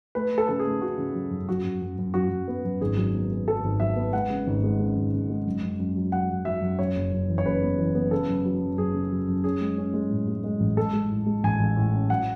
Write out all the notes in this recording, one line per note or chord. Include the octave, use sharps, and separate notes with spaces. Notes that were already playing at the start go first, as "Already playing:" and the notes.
A3 B4
A3
A4
C#3 A4
G#4
A3
C#3 F#4
C#3
F#3
F#2
F#2 F#4
F#2
F#2
F#2
F#2 F#4
F#2
B3
F#2
G#1 G#4
F#3
B3
B3
F#3 A4
G#1
F#3 E5
B3
G#3 F#5
C#3
G#1
G#3
C#3
G#1
C#3
G#3
F#2
F#2
F#2
F#3
F#3 F#5
F#3
F#3 E5
F#2
F#2 C#5
F#1
F#2
E3
C#5
F#1 B4
B3
E3
B3
C#3 A4
F#2
F#3
F#2
F#2 G#4
C#3
F#3
F#2
C#4 G#4
G#3
C#4
G#3
A2
G#3
G#3
A1
G#3 A4
G#3
A2
G#3
A1 G#5
A1
A2
C#4
F#3 F#5